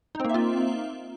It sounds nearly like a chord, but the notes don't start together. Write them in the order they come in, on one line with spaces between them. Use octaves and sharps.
D#4 C4 A#3 E5 F4